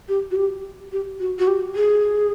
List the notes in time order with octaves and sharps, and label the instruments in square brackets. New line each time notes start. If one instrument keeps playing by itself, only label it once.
[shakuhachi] G4
F#4
G4
G4
F#4
F#4
G4
G#4